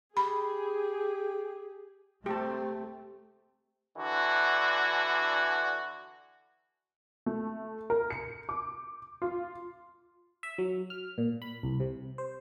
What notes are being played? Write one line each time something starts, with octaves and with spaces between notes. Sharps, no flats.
G4 G#4 B5
C3 A3 C4 G4 A5
D3 E3 D4 F#4
A3
A#4
C#7
D6
F4
E5
F#3
F6
A#2
B5
C2
C3
C5